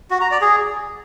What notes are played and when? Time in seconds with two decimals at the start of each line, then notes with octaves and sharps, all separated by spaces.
0.11 F#4
0.21 A#5
0.31 D5
0.41 G#4